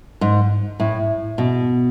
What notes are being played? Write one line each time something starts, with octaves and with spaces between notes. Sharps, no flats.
G#2
A2
B2